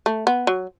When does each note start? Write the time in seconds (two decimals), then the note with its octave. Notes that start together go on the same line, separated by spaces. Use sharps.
0.06 A3
0.27 B3
0.47 F#3